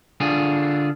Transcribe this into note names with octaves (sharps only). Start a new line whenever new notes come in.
D3 D4 F4 G#4